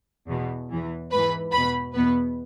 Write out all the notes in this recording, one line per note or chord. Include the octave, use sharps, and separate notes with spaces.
E2 B2
E2 E3
G#2 E3 B4 B5
E2 B2 B4 B5
E2 B2 B3 B4